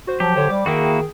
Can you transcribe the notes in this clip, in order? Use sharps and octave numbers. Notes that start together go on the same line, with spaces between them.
F#4 C5
F3 F#3 G4
D3 C5 C#5
G3 D6
D#3 A#3 E4 F#4 G#4 G5